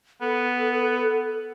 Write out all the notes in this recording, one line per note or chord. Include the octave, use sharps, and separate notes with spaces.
B3 A4